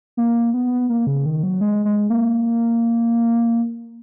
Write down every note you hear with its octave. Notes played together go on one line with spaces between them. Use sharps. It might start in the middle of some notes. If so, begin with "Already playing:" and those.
A#3
B3
A#3
C#3
D#3
F#3
G#3
G#3
A#3